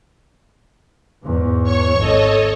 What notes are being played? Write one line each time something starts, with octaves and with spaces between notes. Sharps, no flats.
E2 G#2
C#5 C#6
G#1 A4 C#5 D#5